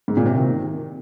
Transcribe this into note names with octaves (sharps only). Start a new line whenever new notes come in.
G#2
A#2
C3
D#3